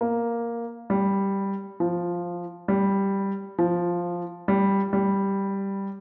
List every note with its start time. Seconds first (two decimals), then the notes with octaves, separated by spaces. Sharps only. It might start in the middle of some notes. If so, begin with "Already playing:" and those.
0.01 A#3
0.90 G3
1.80 F3
2.68 G3
3.58 F3
4.48 G3
4.93 G3